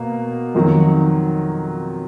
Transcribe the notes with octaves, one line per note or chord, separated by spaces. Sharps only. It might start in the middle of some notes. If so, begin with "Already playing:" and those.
Already playing: B2 A#3
F2 D#3 F#3 F#4